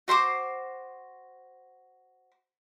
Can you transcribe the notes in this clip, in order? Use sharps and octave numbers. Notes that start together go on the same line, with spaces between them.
F#4 C5 C6 D6